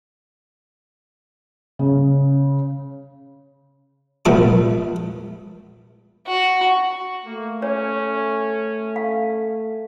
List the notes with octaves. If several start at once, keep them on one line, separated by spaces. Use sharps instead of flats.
C#3
A#1 A#2 F3 A3 B3 D6
F#4
A3 A#3
C#4 C#5
F5